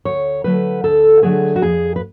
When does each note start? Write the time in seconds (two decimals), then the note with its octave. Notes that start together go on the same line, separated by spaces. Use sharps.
0.05 D2 C#5
0.44 D3 F#3 A3 B4
0.84 D2 A4
1.22 D3 F#3 A3 G#4
1.56 F#4
1.61 F2 G#4
1.96 B4